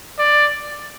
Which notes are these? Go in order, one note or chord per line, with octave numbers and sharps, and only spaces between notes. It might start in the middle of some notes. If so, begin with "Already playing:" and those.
D5